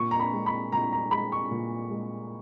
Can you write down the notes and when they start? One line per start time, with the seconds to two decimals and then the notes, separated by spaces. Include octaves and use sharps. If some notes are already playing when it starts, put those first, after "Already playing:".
Already playing: A#2 C#6
0.11 A#5
0.20 B5
0.33 G#3
0.46 B5
0.72 A#2 A#5
0.92 A#5
1.11 G#3 B5
1.32 C#6
1.51 A#2
1.90 G#3